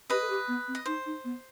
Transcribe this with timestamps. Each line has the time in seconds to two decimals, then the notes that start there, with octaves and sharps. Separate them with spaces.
0.10 G4 B4 D#5
0.21 A4
0.29 G4
0.47 B3
0.67 C4
0.75 D#5
0.86 D#4 C5
1.05 D#4
1.24 B3